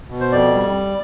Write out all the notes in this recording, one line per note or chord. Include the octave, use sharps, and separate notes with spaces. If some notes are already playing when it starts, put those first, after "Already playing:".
B2
C5
F2 D5
G3